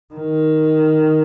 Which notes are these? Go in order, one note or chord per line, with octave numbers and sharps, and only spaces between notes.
D#3